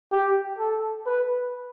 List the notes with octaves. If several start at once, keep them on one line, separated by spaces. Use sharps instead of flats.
G4
A4
B4